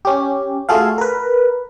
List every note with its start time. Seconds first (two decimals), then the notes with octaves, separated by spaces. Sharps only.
0.05 C#4 G4
0.69 A3 F4 F#4 G#4 A4 F5
0.98 A#4 B4